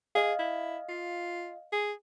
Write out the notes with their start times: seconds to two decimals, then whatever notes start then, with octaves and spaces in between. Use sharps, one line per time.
0.15 G#4 D#5 F5
0.39 E4
0.89 F4
1.73 G#4